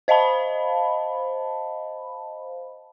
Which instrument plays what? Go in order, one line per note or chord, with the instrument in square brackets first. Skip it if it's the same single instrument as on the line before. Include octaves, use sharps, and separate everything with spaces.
[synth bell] C5 D#5 F5 A5 B5